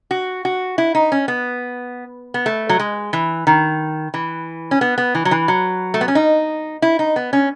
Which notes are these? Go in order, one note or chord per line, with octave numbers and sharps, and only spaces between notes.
F#4
F#4
E4
D#4
C#4
B3
B3
A3
F#3
G#3
E3
D#3
E3
C#4
B3
B3
E3
F#3
E3
F#3
A3
B3
C#4
D#4
E4
D#4
B3
C#4